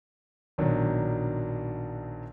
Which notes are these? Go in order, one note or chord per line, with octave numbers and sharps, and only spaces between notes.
A#1 B2 D#3 F#3 D4